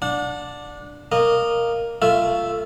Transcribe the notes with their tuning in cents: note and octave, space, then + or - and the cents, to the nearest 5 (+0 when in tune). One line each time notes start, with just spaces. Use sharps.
D4 +0 F#5 -35
A#3 +0 D#5 -20
A3 +15 F4 -15 E5 +0